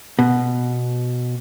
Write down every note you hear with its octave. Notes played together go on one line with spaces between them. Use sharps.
B2